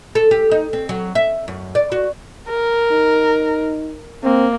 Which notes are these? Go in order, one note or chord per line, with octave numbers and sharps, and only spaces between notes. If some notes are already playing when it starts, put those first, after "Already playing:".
A4
G4
D#4
C4
F#3
E5
F#2
D5
F#4
A#4
D#4
A#3 C4